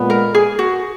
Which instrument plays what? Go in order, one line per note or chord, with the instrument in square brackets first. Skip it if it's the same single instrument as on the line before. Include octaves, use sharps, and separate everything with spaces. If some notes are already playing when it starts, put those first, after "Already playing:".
Already playing: [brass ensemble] A#2 G#3 B3
[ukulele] A#4
G#4
F#4